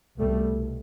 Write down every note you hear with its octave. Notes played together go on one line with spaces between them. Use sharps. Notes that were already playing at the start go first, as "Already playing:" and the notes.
C2 B2 G3 A3